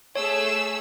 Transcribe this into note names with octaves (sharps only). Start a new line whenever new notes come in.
A3 G#4 C#5 E6